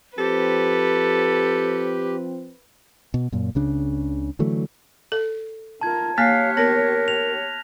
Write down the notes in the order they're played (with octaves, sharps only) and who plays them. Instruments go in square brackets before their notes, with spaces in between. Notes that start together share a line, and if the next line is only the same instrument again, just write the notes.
[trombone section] F3 C4 [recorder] G4 [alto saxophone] A4 [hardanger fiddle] B4
[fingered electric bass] B2
F#2 A#2
C#2 C#3 D4
D3 E3 F#3 A3
[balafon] A4
[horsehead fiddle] F4 A#4 [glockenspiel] A5 G#6
[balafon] A#3 [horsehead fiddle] G4 C#5 [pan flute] F5 [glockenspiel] F6 F#6 B6
[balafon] B3 [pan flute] A#4 [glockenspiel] A#6
[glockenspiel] F7